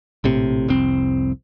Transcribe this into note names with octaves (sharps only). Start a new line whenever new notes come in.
A#1 A2 C3
F1 C2 C4